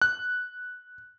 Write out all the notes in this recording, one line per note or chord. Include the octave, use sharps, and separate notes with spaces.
F#6